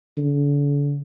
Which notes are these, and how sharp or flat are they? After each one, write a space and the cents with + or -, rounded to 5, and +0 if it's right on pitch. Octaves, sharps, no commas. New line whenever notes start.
D3 -40